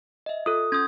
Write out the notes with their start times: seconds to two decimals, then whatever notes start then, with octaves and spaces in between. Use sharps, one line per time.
0.26 D#5 E5
0.46 F4 A4 D#6 F#6
0.72 C#4 C6 D#6 G6 G#6